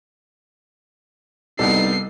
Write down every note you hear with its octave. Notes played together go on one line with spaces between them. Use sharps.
C2 B3 D#4 G4 A4 C7